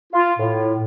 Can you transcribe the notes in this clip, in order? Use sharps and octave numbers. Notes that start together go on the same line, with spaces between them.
F4
A2